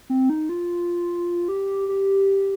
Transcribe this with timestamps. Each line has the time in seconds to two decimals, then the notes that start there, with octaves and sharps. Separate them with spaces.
0.10 C4
0.30 D#4
0.49 F4
1.48 G4
1.88 G4